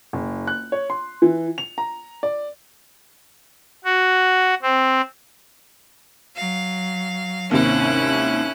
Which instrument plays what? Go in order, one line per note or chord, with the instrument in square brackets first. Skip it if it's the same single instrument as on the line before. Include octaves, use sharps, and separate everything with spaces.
[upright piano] F#1
F#6
C#5
C6
E3
F7
A#5
D5
[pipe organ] F#4
C4
[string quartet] F#3 F5
[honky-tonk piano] D#2 G#2 C3 [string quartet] C#4 E4 F#6